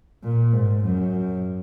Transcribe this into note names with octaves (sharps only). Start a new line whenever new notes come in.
A#2
G#2
F#2